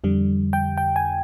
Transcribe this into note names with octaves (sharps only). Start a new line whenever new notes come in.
F2 D3 G3
G5
G5
G#5